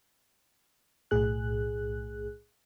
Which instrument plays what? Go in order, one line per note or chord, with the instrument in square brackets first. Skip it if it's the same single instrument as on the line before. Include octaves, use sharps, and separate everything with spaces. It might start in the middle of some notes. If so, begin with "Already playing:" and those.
[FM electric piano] B1 A2 G#4 F#6